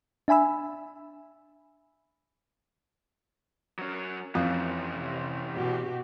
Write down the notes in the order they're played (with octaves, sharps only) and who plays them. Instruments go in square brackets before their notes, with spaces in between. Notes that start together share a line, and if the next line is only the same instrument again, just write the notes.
[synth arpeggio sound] D4 E5 G#5 B5 E6
[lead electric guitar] F#3 C#4
[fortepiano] F2 [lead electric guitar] E3 C#4
[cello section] C3
B2 F#4 G4